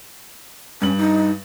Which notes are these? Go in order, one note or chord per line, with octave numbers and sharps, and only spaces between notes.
G2 C#4 F#7
D#4